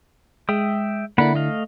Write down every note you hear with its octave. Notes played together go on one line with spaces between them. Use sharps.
G#3 E5 G5 D#6
D3 A#3 D4 E4 F#5 B5
A3 D#5 F5